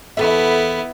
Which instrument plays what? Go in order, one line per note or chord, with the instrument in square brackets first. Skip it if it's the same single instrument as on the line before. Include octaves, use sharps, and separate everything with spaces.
[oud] E2 A4 E5 [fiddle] B3 E4